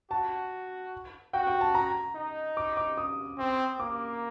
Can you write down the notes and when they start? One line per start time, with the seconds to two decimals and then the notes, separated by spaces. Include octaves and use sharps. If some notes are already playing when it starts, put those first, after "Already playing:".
0.10 F#4 A5
1.33 F#4 G5
1.47 G5
1.61 A5
1.75 A#5
2.15 D#4
2.57 D6
2.77 D6
2.97 D#6
3.38 C4
3.79 A#3 D6